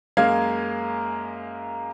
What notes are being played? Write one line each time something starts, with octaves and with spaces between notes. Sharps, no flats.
F#2 G#3 A#3 F5 G#6